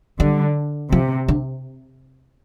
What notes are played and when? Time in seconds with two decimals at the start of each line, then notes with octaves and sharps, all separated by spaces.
0.20 D3 G3
0.92 C3 F3
1.28 D3